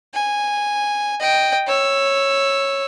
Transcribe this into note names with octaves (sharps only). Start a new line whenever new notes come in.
G#5
D#5 G5
C#5 E6